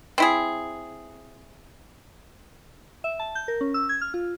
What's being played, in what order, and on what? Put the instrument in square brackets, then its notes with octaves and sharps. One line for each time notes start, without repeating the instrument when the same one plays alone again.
[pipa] C4 E4 G#4
[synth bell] E5
A5
G6
A#4
C#4
E6
G#6
F6
F4